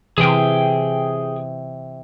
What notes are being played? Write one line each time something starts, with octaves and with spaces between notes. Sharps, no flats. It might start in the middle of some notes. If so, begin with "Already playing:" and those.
C3 E3 G#4 G5